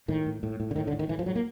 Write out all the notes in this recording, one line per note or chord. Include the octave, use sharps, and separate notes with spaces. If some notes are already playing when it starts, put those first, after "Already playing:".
A2 D#3
A2
A2
A2
D3
A2 D#3
D3
A2
D#3
A2 E3
F3
A2 F#3
A#3